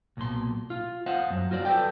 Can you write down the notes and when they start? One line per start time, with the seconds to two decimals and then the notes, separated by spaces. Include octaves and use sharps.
0.17 B1 A#2 C6
0.70 F4
1.06 C5 D#5 F5 F#5
1.30 F#2 F#3
1.51 F4 F#4 C5 D5
1.65 A4 B4 C5 D5 G5